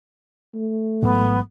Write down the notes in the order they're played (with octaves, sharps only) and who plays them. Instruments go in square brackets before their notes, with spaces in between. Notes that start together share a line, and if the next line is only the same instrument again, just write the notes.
[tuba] A3
[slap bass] A1 G#2 F#3 [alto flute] B3